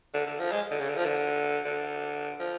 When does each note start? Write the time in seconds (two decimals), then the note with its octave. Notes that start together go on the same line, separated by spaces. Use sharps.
0.14 D3
0.26 D3
0.39 F3
0.52 G#3
0.71 D3
0.80 C#3
0.89 D3
0.96 F3
1.05 D3
1.65 D3
2.39 F3